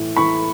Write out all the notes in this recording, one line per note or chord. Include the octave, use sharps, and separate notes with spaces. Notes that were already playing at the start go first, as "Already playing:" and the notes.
Already playing: A2 E3
E3 B5 C#6